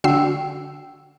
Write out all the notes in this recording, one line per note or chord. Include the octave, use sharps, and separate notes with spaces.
D3 F#4 G5 E6 C7